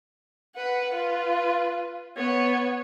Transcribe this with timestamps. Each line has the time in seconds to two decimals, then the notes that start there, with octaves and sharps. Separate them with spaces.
0.55 B4 F#5
0.94 F4 B4
2.17 B3 C#5